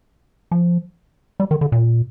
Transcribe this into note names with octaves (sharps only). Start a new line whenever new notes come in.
F3
G3
D#3
D3
A#2